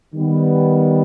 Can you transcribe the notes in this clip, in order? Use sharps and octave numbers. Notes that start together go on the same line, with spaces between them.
D#3 G3 B3